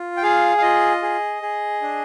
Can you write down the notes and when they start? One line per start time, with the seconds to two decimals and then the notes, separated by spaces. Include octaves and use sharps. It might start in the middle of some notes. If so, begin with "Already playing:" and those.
Already playing: F4
0.17 G5
0.23 G#4 F5
0.58 F5
0.62 F4 D#5
1.02 G#4
1.42 G#4
1.82 D4